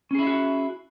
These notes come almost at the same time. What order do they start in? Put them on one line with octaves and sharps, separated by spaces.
C#4 G#4 E4 E5 F#4